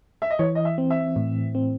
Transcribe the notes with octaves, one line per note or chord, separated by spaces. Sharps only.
E5
D#5
E3 C#5
D#5
E5
C4
E5
A2
C4